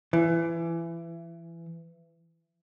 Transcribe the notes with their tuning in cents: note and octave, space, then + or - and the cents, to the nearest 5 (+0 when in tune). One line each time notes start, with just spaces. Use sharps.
E3 +25